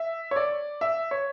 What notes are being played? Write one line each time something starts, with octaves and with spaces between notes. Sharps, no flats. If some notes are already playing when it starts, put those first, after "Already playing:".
Already playing: E5
C#5
D5
E5
C#5